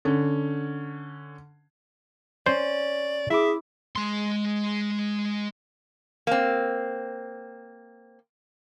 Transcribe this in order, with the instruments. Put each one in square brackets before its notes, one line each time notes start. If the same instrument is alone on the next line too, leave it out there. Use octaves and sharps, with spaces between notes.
[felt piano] D3 C#4
[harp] C#4 [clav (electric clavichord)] C5 [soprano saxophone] D5
[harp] E4 D6 [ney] G#4 [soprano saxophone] E5
[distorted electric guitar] G#3 C6
[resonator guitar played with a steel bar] A#3 C4